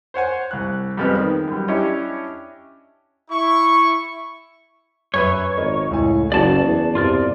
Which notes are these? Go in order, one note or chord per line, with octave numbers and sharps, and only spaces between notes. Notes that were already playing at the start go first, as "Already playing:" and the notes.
C5 C#5 F#5 G#5
C2 F#6
F2 F3 G3 G#3 B3 C4
D#3
F#2 G3
C#4 D4 E4 G4 C#5 D#5
E4 C#6
F#2 B4 C#5 E5
G#1 A#4 D#5
C#2 A2 A3 G#5
F#1 C#4 F#4 G#4 D5 A5
E2
C2 G2 B2 F3 F4 A#4 D5